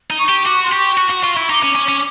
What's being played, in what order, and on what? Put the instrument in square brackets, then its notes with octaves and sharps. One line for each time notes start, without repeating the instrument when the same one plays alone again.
[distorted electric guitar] D#4
[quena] C#6
[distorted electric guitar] G4
[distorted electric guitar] F#4 [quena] D6
[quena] C#6
C6
[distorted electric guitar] G4 [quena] C#6
[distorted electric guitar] F#4
F#4
F4
E4
[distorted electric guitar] D#4 [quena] D6
[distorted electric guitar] C#4
C#4
C#4